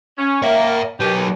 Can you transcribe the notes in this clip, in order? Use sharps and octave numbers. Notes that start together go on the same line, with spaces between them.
C#4
A#3 C#5 E5
D#3 F#3 G4 B4
D#2